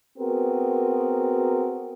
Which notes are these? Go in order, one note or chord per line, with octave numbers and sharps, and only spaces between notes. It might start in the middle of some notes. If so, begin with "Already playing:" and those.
B3 C4 F#4 G#4 A#4